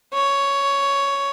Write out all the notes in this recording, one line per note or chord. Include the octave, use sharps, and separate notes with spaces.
C#5